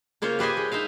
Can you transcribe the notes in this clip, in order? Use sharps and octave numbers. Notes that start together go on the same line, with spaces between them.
C#3 A#3 F4 C5 C#5
G4 B4 C5 D#5 G#5
G#3
D#4 C5 E5 F5